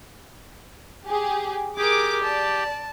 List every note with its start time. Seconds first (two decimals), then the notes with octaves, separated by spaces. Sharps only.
1.05 G4 G#4
1.78 G4 G#4 A#4 D6
2.24 D5 A5